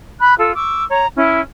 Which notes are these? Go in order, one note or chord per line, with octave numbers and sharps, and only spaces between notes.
B5 F#6
F4 A4
C#6 D6 E6
C#5 A#5
C#4 E4